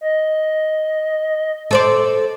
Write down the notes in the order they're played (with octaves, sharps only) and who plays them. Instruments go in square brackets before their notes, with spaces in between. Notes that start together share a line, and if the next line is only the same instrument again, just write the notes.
[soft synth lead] D#5
[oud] A4 C5 D5